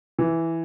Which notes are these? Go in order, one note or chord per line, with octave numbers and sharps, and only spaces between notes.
E3